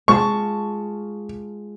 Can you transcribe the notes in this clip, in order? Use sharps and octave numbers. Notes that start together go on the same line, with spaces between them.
G#3 F4 A5 C#6